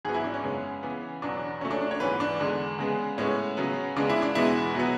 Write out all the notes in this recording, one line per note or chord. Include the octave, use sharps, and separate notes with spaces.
G#2 F#3 B3 G#4
E4
D4
C#4
F#2 C#3 G#3 B3
C#3 E3 B3
E2 B2 F#3 B3 D4
C#3 F#3 A3 C#4
D4
D4
C#5
G#2 E3 B3 B4
D4
E2 D3 G#3 B3
C#3 G#3 B3
A2 G#3 B3 C#4
C#3 F#3 B3
C#3 G#3 B3 D4
E4
D4
E2 B2 G#3 B3 E4
B2 F#3 B3